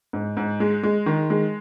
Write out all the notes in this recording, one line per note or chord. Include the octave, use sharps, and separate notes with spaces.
G#2
G#2
G#3
G#3
D#3
G#3